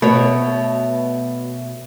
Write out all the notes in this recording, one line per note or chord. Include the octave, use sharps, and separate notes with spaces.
B2 A3 C#5